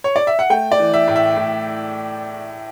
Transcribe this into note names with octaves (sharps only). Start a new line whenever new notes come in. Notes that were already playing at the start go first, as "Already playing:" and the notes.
C#5
D5
E5
F#5
A3 G5
D5
E3
E5
A2
E5
A2